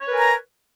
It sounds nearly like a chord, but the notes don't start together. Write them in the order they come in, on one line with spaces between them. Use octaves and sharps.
C#5 B4 A#4 G#5 A#5